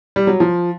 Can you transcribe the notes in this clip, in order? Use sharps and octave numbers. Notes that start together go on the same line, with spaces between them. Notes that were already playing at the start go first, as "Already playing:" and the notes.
G3
F#3
F3